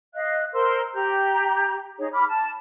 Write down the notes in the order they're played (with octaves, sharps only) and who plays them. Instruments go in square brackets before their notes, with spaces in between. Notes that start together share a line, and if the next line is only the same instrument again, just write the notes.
[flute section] D#5 F5 F#6
A#4 C5 C6 E6
G4 A#5 G6
D#4 G#4 C#5
B5 D6 F6
A5